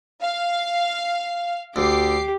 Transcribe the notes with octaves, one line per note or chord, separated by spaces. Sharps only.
F5
D2 G4 D6 C7